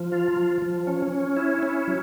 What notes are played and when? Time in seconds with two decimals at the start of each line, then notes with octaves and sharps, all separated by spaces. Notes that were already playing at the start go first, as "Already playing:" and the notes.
Already playing: F3
0.12 F4
0.37 F3
0.62 F3
0.87 C#4
1.12 C#4
1.37 E4
1.63 C#4
1.87 F#3